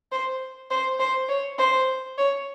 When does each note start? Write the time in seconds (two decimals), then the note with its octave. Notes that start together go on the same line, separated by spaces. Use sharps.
0.12 C5
0.70 C5
1.00 C5
1.29 C#5
1.58 C5
2.18 C#5